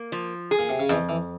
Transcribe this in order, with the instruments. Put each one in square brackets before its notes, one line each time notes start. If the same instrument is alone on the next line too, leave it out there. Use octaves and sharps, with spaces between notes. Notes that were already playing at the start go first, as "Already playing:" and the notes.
Already playing: [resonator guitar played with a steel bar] A#3
F3
G#4
[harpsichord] A#2
C3
C#3
[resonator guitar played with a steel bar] F2 [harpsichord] E3
[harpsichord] E3